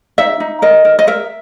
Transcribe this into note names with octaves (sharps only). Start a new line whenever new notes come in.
D#4 E5
D#4
A#4 D#5
A#4
D#5
A#4 E5